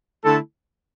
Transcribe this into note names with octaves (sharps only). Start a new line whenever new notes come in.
D3 A3 E4 A4